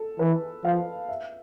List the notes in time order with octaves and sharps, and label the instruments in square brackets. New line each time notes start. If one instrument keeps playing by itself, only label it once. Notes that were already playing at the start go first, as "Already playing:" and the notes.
Already playing: [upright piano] A4
[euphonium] E3 [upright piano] B4
[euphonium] F3 [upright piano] F5
[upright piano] E5